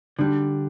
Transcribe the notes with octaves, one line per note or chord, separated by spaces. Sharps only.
D3 G3 D4